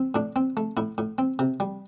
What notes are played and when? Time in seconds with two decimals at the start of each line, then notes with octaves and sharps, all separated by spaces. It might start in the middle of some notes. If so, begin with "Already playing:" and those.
Already playing: C4
0.15 A2 D4
0.36 C4
0.57 A3
0.77 A2 E4
0.98 A2
1.18 C4
1.39 C3
1.60 G3